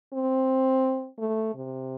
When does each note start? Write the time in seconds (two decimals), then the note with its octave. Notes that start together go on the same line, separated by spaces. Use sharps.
0.13 C4
1.19 A3
1.55 C3